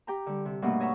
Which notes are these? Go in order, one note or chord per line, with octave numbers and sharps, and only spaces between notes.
G4 G5 A#5
D3 G3
C3
G2 B2 A3 A#3 G4 F#5
C#5 D#5 E5 F#5 A#5 C#6